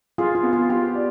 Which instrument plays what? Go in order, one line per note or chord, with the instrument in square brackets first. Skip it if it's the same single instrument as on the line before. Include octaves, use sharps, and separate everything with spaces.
[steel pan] F4 [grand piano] G#4
[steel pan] F4
[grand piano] B3
[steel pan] F4
[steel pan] F4 [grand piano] G4
[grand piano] D5